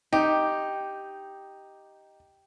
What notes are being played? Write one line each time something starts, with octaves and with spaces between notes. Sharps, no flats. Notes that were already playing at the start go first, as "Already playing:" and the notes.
D#4 G4